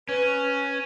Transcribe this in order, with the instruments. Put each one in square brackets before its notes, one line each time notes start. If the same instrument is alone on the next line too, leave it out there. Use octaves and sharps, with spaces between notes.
[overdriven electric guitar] C#4 [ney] B4